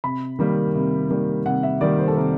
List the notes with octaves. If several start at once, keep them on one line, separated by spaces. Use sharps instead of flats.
C3 B5
D#3 G3 A#3
C3
D#3 G3 A#3
C3 F#5
E5
D#3 G3 A#3 D5
C5
A4
C3 A#4